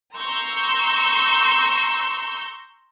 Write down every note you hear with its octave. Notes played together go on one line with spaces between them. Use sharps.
A#5 C6 C#6 E6 G6